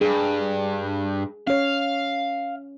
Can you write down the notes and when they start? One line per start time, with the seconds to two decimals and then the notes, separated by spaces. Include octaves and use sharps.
0.01 G2 G#4
1.47 C#4 C#5 F5